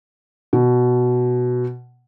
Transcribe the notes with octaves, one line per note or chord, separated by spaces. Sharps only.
B2